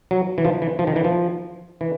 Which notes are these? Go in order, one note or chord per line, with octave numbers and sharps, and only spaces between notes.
F#3
E3
F3
E3
F3
D#3
E3
F3
E3